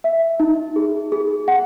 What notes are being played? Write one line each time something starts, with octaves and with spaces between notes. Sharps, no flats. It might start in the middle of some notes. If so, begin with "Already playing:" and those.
E5
D#4
G#4
G#4
F#5